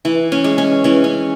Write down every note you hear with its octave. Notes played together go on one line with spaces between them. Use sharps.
E3
C#4
G#3
C#4
E3 C#4
C#4